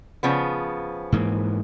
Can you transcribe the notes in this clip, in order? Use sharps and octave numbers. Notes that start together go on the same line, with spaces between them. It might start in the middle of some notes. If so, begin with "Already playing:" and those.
C#3 F3 B3
G#2 E3 A#3